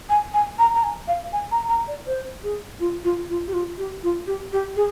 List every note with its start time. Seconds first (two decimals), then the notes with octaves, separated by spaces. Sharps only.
0.09 G#5
0.33 G#5
0.58 A#5
0.75 A#5
0.83 G#5
1.07 F5
1.33 G#5
1.51 A#5
1.69 A#5
1.87 D5
2.07 C5
2.43 G#4
2.80 F4
3.04 F4
3.29 F4
3.47 G4
3.53 F4
3.78 G4
4.03 F4
4.27 G4
4.52 G4
4.76 G#4